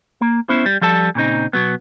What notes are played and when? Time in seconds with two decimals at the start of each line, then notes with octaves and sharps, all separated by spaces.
0.21 A#3
0.49 B3 C#4 E4 C5
0.66 G3
0.81 F3 G3 A4 A5
1.15 A#2 C#3 C4 D#4
1.53 B2 F#3 B3